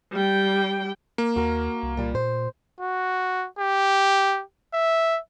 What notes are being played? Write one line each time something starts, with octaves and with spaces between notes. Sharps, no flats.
G3 G5
A#3
D#2 F#4 A#4
C2
A#2 G3
A#2 C5
F#4
G4
E5